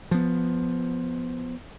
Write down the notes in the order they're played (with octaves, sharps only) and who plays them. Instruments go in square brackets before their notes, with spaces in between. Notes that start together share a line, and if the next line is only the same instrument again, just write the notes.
[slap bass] F3 B3